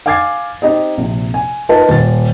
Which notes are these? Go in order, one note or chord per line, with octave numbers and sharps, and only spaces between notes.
F5 G#5 D6 G#6 A6 C7
C4 D#4 G4 D#5
A#1 C3
G#5
D#4 F4 A#4 B4 A5
D#1 A6